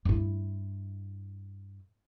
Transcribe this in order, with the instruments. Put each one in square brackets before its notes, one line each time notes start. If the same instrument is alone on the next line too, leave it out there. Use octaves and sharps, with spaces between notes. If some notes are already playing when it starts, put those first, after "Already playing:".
[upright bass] G2 E4